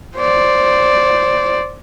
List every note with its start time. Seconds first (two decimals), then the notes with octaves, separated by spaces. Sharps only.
0.18 C5 D5